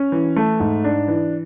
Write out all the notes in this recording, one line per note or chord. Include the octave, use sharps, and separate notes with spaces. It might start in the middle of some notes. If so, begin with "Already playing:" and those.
Already playing: C#4
E3
A3
G#2
D4
E3